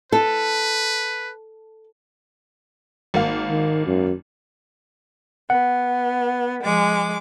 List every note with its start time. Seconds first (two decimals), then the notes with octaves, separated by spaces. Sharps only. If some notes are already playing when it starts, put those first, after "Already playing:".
0.12 A4 B4
3.14 G#1 A#3 F5
3.50 D#3
3.87 F#2
5.50 B3 F#5
6.62 F3 G#3 D6